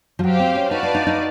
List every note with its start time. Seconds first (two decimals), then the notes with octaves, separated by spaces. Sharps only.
0.19 F3
0.23 F#3 G4 C5 F5
0.40 C4
0.55 C#4
0.71 D#4 F#4 B4 D5 F5 A5
0.83 D#4
0.95 D#4
1.07 D#4